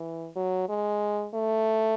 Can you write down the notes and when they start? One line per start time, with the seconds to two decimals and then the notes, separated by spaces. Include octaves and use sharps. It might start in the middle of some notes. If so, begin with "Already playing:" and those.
Already playing: E3
0.36 F#3
0.69 G#3
1.34 A3